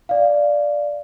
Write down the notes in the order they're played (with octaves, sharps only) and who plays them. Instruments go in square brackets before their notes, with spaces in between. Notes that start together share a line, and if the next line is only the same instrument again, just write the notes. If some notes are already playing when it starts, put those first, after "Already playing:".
[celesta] D5 F5